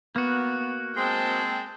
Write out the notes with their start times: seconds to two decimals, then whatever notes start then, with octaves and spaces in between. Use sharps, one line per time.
0.16 A#3 B3 F#4
0.96 G#3 C4 G5 A5